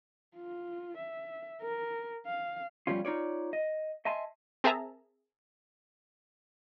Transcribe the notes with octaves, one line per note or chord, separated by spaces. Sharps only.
F4
E5
A#4
F5
G2 B2 F3 G3 C#4 F4
D#4 F4 C#5 D5
D#5
D#5 E5 G#5 A5 C6
C4 G#4 A#4 E5 A5 A#5